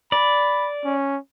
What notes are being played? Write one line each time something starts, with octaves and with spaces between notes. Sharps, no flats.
D5 B5
C#4